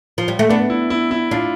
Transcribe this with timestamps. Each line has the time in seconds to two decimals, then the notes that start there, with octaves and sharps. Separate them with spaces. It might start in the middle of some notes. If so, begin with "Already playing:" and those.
0.18 F3
0.28 G3
0.39 A3
0.49 B3 D4
0.70 E4
0.90 E4
1.11 E4
1.31 D4 F4